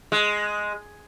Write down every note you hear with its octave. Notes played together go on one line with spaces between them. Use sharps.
G#3